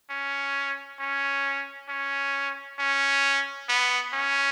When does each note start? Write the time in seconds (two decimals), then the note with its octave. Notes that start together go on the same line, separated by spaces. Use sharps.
0.10 C#4
1.00 C#4
1.89 C#4
2.79 C#4
3.69 B3
4.13 C#4